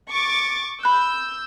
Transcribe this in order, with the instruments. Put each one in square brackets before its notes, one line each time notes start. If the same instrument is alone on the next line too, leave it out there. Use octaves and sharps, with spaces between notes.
[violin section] C#6 D6 A6
[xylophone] B5 F#6 [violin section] E6 G6